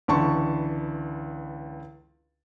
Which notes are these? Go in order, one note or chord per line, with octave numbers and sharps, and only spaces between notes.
C#2 D3 E3 A5 C6 C#6